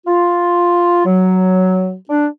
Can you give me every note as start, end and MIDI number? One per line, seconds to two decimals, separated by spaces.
0.06 1.02 65
1.06 1.94 54
2.10 2.27 62